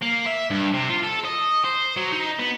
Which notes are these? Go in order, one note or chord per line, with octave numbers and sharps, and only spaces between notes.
A#3
E5
G2
C3
F4
A4
D#5
C5
F#3
D#4
B3